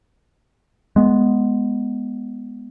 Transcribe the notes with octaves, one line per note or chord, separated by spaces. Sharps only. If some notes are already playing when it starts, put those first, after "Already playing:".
G#3 B3